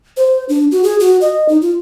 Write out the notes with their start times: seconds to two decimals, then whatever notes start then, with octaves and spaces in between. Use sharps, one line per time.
0.17 C5
0.49 D4
0.72 F#4
0.84 G#4
1.00 F#4
1.21 D#5
1.49 D#4
1.62 F4